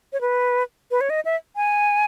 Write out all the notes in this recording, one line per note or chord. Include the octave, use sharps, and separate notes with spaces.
C#5
B4
B4
C#5
D#5
E5
G#5